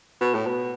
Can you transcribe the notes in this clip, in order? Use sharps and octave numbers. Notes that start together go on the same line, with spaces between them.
B2
A2
B2